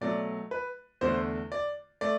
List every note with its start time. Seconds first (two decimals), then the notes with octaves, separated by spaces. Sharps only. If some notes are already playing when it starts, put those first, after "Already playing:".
0.01 B2 F#3 A3 D5
0.51 B4
1.01 E2 D3 A3 C5
1.52 D5
2.01 A3 D5